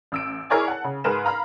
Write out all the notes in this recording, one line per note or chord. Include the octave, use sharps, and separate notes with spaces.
A1 E6 D7
E4 G#4 A#4 C#5 D5 G#5
F#5 A5
C#3
G#2 G#4 A#4 B4 C6 E7
F5 A#5 B5 F6